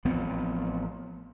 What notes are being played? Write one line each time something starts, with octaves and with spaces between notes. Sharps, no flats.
A1 F3 B3 C4